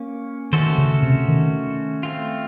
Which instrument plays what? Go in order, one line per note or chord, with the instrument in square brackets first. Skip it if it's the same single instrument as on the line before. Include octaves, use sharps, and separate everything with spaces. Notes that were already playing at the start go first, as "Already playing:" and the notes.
Already playing: [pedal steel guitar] A#3 C#4
[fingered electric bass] D#3 [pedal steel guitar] A3 C#4 F#4 A4 C5
[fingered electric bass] C#3
C3
D#3
[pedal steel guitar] A3 C4 F4